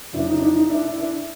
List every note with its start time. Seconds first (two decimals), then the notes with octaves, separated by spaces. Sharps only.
0.13 F2 C#3 F#3 D4 E4
0.27 D#4
0.37 D4
0.41 D#4
0.55 D#4
0.69 D4 E4
0.83 D4 E4
0.97 D4 E4